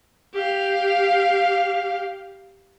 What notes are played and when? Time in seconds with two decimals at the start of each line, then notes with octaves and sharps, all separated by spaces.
0.34 G4 F5